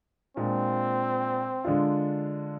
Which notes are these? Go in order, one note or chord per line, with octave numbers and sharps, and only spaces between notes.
A#2 G#3 C4 D4 F4
D3 G#3 D4 F4